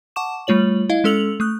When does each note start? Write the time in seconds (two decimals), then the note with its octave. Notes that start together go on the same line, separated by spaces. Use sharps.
0.16 F#5 A5 C#6 D6 E7
0.47 G3 A3 F4 C#5 F#7
0.89 E4 D#5 F5
1.04 G#3 C#4 A4 E6 F7 F#7
1.40 A3 D#6 F#6